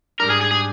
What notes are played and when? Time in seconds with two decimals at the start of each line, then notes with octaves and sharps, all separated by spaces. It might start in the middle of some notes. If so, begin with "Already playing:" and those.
0.19 G#2 G3 D4 A#4
0.30 G#4
0.41 G#4
0.51 G#4